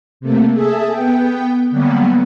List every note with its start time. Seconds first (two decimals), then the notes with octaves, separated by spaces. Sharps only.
0.20 C3 A3 A#3
0.53 G#4 A4 E5
0.91 B3 G5
1.70 D3 F#3 G3 A#3 B3